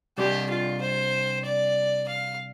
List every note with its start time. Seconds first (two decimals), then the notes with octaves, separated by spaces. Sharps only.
0.18 C3 G3 D4 G4
0.50 F4
0.82 C5
1.45 D5
2.08 F5